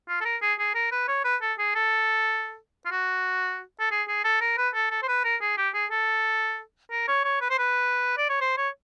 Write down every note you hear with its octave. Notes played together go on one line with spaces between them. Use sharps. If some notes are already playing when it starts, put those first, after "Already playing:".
F4
A4
A#4
G#4
G#4
A#4
B4
C#5
B4
A4
G#4
A4
F4
F#4
A4
G#4
G#4
A4
A#4
B4
A4
A4
C5
B4
A#4
G#4
G4
G#4
A4
A#4
C#5
C#5
B4
C5
B4
D5
C#5
C5
C#5